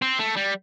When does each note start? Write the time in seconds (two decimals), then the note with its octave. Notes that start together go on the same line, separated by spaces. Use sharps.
0.02 C4
0.19 A3
0.37 G3